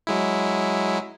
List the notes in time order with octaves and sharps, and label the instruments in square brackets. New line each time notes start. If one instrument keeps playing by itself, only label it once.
[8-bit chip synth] F#3 G#3 E4